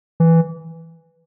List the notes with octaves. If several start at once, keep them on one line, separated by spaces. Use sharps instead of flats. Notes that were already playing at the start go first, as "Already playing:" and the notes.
E3